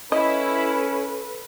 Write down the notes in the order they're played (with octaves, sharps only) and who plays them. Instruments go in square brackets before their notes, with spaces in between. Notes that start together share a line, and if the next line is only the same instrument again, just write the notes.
[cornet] C#4 [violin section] E4 [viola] A4 B4 [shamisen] D#5